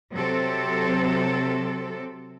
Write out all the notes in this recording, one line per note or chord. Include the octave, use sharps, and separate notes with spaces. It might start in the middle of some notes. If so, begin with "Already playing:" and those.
C3 F#3 C4 A4